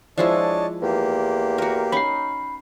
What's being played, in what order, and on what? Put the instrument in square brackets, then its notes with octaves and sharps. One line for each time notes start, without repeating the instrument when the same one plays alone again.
[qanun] F3 G#3 E4 [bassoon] D4 [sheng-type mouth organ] C#5 D#5 A5
[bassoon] E2 [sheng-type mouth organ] A#3 G4
[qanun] F#4 A#4
[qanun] C#4 D#4 [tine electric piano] B5 C7